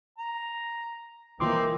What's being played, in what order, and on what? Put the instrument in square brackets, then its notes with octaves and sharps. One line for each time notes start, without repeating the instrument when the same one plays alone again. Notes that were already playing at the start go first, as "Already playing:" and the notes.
[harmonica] A#5
[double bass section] E3 A#3 [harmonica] C4 D#4 [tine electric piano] F4 C6 D6